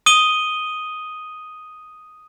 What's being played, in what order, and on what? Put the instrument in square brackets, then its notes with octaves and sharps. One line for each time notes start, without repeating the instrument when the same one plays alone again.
[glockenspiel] D#6 D#7 G7